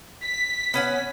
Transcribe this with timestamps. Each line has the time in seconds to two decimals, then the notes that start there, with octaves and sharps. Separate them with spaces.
0.22 B6
0.74 B3 C#4 F#5